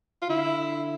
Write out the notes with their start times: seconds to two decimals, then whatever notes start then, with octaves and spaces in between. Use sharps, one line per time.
0.22 F4
0.29 D3 E4